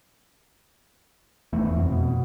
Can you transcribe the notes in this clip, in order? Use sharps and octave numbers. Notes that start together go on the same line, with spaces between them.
E1 E2 A3
F2
B2